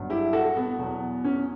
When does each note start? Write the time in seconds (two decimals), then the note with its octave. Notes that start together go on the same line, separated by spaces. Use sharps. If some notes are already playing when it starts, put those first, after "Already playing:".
Already playing: G1 G2 F#3
0.10 E4 G4
0.33 F#4 A4
0.56 B3
0.79 E2 B2 F#3
1.24 C#4